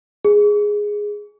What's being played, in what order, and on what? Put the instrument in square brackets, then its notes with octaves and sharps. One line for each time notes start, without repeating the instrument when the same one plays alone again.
[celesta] G#4